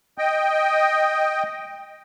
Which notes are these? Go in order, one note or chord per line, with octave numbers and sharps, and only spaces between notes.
D#5 G5